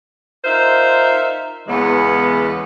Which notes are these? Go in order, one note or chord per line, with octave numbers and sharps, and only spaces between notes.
D#4 F4 A#4 C5 E5
E2 C#3 E3 G#3 B3